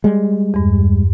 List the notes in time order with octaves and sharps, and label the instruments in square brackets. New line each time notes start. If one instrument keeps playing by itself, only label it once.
[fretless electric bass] G3 G#3
[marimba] E2 G2